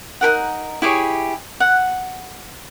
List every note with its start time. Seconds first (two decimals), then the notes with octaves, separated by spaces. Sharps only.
0.21 D#4 G4 A#4 F#5
0.82 E4 G4 G#4 C#5
1.60 F#5